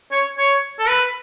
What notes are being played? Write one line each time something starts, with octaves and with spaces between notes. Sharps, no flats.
C#5
C#5
A4
B4